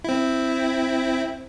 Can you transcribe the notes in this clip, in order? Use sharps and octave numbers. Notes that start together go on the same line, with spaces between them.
C4 E4